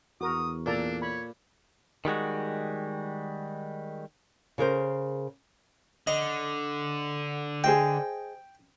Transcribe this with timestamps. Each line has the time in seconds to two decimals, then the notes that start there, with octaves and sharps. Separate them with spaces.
0.21 E2 F#4 A#4 D#6
0.66 A#2 D4 A4 D5 A#5
1.02 C#5 B5
2.05 D#3 G3 G#3 F#4
4.58 C#3 G#4 A#4 C5
6.07 D3 D#5
7.64 G#4 C5 D#5 G5